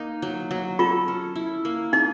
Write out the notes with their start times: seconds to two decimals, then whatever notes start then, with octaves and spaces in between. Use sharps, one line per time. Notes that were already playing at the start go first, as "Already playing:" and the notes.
Already playing: A#3 D#4
0.22 F#3
0.51 F#3
0.79 F4 A4
1.08 C#4
1.36 E4
1.65 A#3
1.93 D#4 G#4